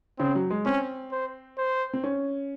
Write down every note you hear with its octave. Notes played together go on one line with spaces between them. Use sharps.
C#3 C4
F#3
G#3
C4 C#4
C5
C5
C4
C#4